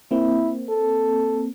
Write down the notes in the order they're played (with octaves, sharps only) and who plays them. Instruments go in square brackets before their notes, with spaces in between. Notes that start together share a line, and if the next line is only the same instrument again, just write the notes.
[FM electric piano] A#3 C4 [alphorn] E4
[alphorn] A4